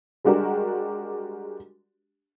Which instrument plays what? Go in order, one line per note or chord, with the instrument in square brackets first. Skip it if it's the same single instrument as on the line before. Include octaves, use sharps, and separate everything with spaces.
[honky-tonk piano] G3 G#3 D4 F#4 G4 A#4